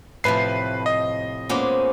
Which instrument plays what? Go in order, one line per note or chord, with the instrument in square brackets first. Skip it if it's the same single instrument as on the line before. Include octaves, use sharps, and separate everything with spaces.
[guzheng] A2 C3 F3 [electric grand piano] B4 C7
[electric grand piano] D#5
[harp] A#2 C5 D6 [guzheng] G#3 B3 C#4